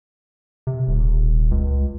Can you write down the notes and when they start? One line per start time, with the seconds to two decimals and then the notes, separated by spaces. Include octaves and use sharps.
0.67 C3
0.87 D#1
1.51 C#2